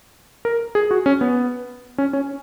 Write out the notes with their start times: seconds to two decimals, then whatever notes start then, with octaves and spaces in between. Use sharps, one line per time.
0.45 A#4
0.75 G#4
0.91 F#4
1.06 C#4
1.21 B3
1.98 C#4
2.13 C#4